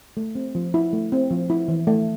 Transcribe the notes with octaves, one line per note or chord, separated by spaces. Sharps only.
A3
C4
F3
E4
A3
C4
F3
E4
E3
A3